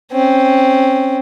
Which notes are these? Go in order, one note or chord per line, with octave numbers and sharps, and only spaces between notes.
C4 C#4